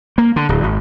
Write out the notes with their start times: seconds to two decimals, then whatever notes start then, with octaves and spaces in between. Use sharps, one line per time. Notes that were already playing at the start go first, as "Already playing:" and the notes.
0.18 A#3
0.36 D3
0.49 D1
0.64 G#1